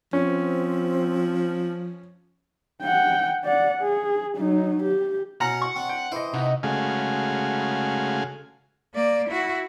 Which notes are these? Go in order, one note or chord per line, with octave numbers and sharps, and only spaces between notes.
F3 C4 C#4
F#5 G5
D5 F#5
G#4
F#3 D#4
G4
B2 C#4 F#5 A#5
C#6
C4 D4
G5
E3 C5 D#5
C3 D#4 F#4
C#3 G#3 A3 F#4 F5 G#5
A#3 D5
E4 F#4